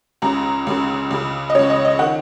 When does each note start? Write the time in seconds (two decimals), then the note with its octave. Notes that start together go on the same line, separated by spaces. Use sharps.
0.22 C#2 C#3 A#5
0.67 C#2 C#3
1.10 C#2 C#3
1.50 D#5
1.55 C#3 C#5
1.59 C#2
1.70 D#5
1.85 D#5
1.99 D#3 F#5